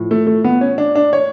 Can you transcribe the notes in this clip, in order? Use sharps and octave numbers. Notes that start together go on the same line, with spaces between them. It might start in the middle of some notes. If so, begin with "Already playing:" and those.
Already playing: A2 F3
A3
A3
B3
C#4
D4
D4
C#5